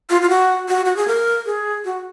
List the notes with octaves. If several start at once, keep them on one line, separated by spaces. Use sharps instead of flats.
F4
F4
F#4
F#4
F#4
G#4
A#4
G#4
F#4